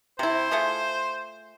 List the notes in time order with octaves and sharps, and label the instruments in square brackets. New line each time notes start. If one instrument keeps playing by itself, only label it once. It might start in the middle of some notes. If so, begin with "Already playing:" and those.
[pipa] C3 E4 [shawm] C5
[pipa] A3 F4 G#4